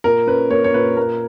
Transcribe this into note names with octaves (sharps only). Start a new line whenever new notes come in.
A#2 A#4
C#4 B4
A#3 C#5
C#5
A#2 B4
A#3 A#4